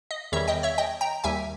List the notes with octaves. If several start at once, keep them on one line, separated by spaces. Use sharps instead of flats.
D#5
E2 D#3 G3 C#5 E5
D#5 G5
C#5 E5
D#5 G5
G5 A#5
D#2 D#3 G3 E5 G#5